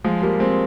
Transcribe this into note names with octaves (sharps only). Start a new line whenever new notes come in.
F3 G#3
G3 A#3
G#3 C4